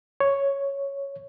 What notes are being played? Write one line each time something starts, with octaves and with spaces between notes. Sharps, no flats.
C#5